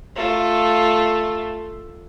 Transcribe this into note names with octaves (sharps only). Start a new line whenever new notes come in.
A3 F4